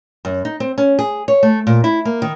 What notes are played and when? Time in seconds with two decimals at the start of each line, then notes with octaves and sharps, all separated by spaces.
0.25 F#2
0.45 D#4
0.60 C4
0.78 C#4
0.99 G#4
1.28 C#5
1.43 A3
1.67 A#2
1.84 E4
2.05 A#3
2.22 D#3